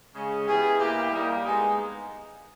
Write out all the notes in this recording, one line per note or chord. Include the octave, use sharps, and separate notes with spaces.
C#3 G#3 C#4
G3 B3 E4 G#4
A#2 A#3 E4 G4
G3 A#3 D#4
G#3 B3 D#4